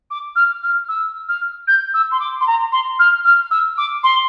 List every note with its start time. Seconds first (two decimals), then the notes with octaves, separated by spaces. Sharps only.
0.10 D6
0.35 F6
0.63 F6
0.88 E6
1.28 F6
1.67 G6
1.94 E6
2.11 C6
2.20 D6
2.40 C6
2.47 A#5
2.72 C6
2.99 F6
3.25 F6
3.51 E6
3.77 D6
4.03 C6